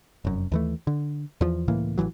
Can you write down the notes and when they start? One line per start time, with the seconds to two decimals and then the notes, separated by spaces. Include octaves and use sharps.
0.25 F1 F#2
0.52 D#2 E3 A3
0.87 D3
1.41 E2 F3
1.68 C#2 A2 E3 A#3
1.98 A1 A#2 E3 F#3